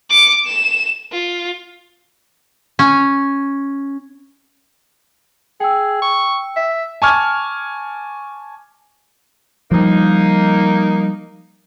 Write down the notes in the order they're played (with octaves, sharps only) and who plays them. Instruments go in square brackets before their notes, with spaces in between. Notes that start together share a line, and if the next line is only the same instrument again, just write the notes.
[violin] D6 C#7
E7
F4
[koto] C#4
[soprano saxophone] G#4 [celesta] G5 E6
[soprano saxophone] C#6
E5
[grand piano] G#5 A5 C#6 D6 F6 G#6
[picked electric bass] F3 G3 [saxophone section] A#3 D#4